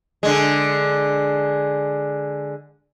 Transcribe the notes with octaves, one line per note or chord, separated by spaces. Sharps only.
D3 G#3